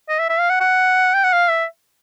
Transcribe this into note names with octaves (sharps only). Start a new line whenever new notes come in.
D#5
E5
E5
F5
F#5
F#5
G5
F#5
F5
E5